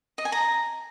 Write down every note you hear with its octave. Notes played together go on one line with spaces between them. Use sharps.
D#5
G#5
A#5